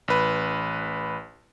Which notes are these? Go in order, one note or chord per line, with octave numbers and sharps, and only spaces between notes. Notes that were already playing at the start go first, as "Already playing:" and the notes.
A1 B4